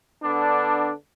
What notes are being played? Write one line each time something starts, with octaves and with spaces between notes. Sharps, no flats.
D3 B3 D4